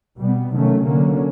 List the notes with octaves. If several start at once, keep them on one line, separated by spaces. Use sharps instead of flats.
B2 G3 B3
C3 D#3 F#3 A3 C#4
D3 F#3 A#3 C#4